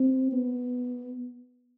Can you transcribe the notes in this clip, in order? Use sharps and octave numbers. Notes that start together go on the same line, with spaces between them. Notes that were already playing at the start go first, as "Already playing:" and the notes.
Already playing: C4
B3